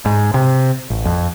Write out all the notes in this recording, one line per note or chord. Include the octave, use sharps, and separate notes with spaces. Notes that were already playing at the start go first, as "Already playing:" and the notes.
G#2
C3
A1
F2